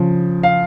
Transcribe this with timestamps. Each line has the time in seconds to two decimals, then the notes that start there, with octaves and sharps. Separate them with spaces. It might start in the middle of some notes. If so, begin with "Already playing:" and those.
Already playing: C#3 F3
0.43 F5